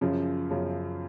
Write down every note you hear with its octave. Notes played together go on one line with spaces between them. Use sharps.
F#2 C#3 F3
F#2 C#3 F3